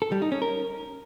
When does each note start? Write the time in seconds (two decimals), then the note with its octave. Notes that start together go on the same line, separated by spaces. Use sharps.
0.02 A4
0.12 G3
0.22 D#4
0.32 C#4
0.42 A#4